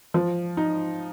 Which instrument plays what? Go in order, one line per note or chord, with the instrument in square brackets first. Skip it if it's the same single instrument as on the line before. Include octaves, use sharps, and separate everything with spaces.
[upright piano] F3
D#4